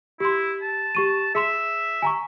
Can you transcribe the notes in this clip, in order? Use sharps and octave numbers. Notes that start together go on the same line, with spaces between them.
E4 G4 C6
A5
G4 C#6 D#7
G#4 E5 C6 E7
G#5 A#5 C#6